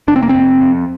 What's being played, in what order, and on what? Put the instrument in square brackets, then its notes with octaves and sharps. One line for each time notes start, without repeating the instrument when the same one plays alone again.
[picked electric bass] F1 D4
C4
A#3
F2 C4
F2